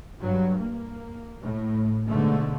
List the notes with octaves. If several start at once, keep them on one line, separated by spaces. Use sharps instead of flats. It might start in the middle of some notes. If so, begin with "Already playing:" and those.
G2 F#3
A#3
A2
G#2 B2 D3 A3